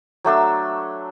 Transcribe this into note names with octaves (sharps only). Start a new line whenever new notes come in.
F#3 A3 D4 E6